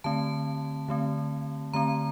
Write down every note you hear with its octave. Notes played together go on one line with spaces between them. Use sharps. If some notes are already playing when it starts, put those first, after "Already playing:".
D3 A3 C4 A5
D3 A3 C4
D3 A3 C4 A#5